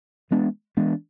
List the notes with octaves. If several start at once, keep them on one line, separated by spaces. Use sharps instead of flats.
E3 G#3 B3 D4
E3 G#3 B3 D4